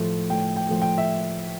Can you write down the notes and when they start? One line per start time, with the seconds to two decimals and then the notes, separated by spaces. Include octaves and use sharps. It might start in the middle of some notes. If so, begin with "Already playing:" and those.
Already playing: A2 F3 A3
0.30 A2 G5
0.57 G5
0.69 F3 A3
0.82 G5
0.98 E5